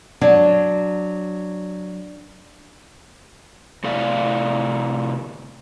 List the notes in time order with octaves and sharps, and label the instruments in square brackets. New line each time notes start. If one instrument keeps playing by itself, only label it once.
[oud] F#3 [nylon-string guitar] D4
[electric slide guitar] A2 C3 A4 D5 F5